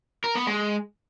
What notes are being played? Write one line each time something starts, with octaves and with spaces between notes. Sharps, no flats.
A#4
B3
G#3